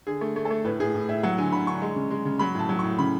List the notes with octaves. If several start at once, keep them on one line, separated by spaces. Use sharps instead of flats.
D3 G#4
A3
A3
A4
A3
A2 B4
A2 G#4
A2
A2 E5
F#3 F#5
D3 G#5
D3 B5
D3 C#6
G#3
C#3
G#3
C#3
F#3 B5
A2 A5
F#3
A2 C#6
C#3 B5